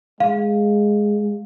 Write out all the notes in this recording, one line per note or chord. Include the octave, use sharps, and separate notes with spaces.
G#3 F5